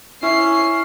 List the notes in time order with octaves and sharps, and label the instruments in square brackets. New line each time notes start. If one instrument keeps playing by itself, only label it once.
[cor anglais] C#4 [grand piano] E4 [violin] C7